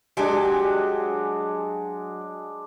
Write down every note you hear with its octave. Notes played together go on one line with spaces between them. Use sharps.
F#3 G#3 D4 G4 G#5